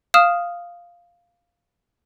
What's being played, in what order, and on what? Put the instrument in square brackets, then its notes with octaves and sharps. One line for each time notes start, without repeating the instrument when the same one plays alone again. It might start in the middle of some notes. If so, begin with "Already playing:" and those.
[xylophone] F5 D#6 F6 E7